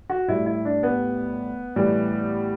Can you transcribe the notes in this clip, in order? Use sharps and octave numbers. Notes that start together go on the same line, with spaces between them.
F#4
A2 G3 E4
E4
D4
B3
A2 E3 G3